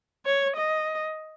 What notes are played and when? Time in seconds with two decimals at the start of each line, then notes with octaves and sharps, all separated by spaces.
0.25 C#5
0.56 D#5